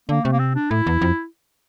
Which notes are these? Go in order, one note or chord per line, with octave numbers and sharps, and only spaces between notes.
D3 A#3
C3 A3
A#3
C4
D4
A2 E4
E2
F2